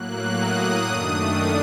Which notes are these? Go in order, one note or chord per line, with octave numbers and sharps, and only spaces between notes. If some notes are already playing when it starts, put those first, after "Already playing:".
Already playing: A2 F#3 A#3 F#6
D#6
F#2 D#3 A3 D4